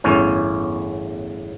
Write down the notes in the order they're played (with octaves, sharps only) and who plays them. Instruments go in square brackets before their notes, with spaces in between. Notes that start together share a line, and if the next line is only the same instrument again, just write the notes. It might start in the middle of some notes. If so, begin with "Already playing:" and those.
[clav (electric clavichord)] G1 E2 A2 C#4